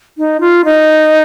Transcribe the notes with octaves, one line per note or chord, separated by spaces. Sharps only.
D#4
F4
D#4